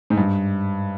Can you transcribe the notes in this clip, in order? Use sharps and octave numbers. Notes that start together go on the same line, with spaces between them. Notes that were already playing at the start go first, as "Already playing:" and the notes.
G#2
G2